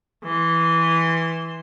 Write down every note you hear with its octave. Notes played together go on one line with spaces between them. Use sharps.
E3 C6